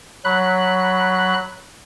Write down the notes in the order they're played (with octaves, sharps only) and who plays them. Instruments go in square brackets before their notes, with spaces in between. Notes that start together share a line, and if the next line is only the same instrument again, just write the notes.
[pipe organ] F#3 B5 F#6